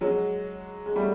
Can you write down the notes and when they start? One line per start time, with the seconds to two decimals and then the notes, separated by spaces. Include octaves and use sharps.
0.01 F#3 G#3
0.86 G#3
0.96 G3 A3